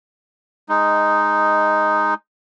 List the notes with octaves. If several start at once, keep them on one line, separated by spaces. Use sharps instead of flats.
G#3 D#4